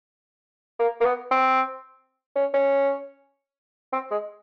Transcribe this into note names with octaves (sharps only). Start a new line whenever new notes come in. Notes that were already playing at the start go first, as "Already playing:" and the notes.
A#3
A#3
B3
C4
C#4
C#4
C4
G#3